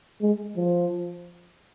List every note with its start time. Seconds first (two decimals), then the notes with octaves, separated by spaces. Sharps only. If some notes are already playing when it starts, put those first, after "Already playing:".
0.22 G#3
0.56 F3